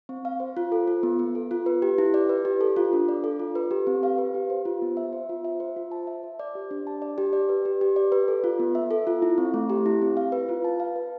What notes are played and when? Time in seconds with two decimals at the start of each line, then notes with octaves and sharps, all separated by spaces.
0.09 C4
0.25 F5
0.40 C5
0.57 F4
0.72 A4
0.87 F4
1.03 B3
1.19 B3
1.35 A4
1.51 F4
1.66 B4
1.82 G4
1.98 E4
2.14 D5
2.29 B4
2.45 G4
2.61 A4
2.76 F4
2.93 D4
3.08 D5
3.24 A4
3.39 F4
3.55 B4
3.71 G4
3.87 C4
4.03 F5
4.18 B4
4.34 G4
4.50 C5
4.65 F4
4.82 B3
4.97 E5
5.13 C5
5.29 F4
5.45 E5
5.60 C5
5.76 F4
5.92 A5
6.07 E5
6.23 C5
6.39 D5
6.55 G4
6.71 D4
6.87 A5
7.02 D5
7.18 G4
7.33 D5
7.49 B4
7.65 G4
7.81 G4
7.96 D5
8.12 B4
8.28 A4
8.44 F4
8.59 B3
8.75 E5
8.91 A4
9.07 F4
9.22 E4
9.38 C4
9.54 A3
9.70 G4
9.86 E4
10.02 C4
10.17 F5
10.32 B4
10.49 F4
10.64 A5
10.80 F5
10.96 B4